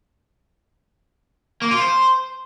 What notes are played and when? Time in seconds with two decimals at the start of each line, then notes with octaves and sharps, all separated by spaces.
1.62 A#3
1.71 F4
1.80 C5